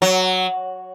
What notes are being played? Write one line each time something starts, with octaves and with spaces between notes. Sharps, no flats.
F#3